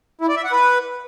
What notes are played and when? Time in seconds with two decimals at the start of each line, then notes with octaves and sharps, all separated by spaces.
0.21 E4
0.29 D5
0.37 E5
0.44 F#5
0.52 B4